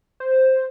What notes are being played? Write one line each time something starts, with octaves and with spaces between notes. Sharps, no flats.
C5